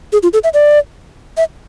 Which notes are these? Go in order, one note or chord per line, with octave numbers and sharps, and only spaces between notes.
G#4
F4
A4
E5
D5
E5